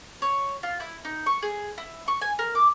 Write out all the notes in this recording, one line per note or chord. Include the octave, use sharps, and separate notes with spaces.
C#5
F4
E4
D#4
C#6
G#4
E4
C#6
G#5
A#4
D6